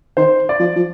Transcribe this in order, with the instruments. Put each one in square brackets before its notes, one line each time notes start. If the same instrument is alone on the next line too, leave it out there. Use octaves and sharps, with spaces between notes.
[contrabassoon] D#3 [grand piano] C5
[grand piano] D5
[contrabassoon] F3
F3